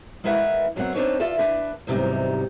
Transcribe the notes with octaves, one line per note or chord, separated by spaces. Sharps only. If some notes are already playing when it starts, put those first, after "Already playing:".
G#3 A#3 E4 B4 E5 F#5
F#2 F#3 B3 C4 F#5
C4 D4 D#4 A4 B4 C#5
F4 A4 D5 E5
D4 B4
E2 G#2 C3 F#3 G3 D#4